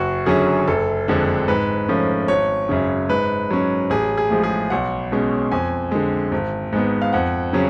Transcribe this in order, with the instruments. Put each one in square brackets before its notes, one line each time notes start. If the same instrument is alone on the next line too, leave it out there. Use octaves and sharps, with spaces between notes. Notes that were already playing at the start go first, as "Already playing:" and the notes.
Already playing: [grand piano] F#1 F#4
F#2 D3 F#3 C#4 G#4
F#1 A4
F2 D3 G#3 D4
G#2 B4
F3 A3 C#4
G#1 C#5
F#2 C#3
G#2 B4
F#3 C#4
A1 G#4
G#4
A2 F3 G#3
G#4
B1 F#5
B2 G#3 C#4
F2 G#5
D3 G#3
G#1
G#2 G#3 B3
F5
F2 F#5
C#3 F#3 C#4